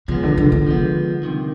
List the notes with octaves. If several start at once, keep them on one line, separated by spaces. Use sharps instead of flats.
C#3 F3 G#3 B3
D3
D3
D3
F3 G#3 B3
C2 C3 D#3